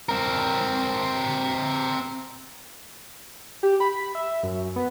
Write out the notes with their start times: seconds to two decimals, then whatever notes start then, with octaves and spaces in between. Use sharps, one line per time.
0.09 C4 A#4
3.63 G4
3.80 B5
4.15 E5
4.43 F#2
4.76 B3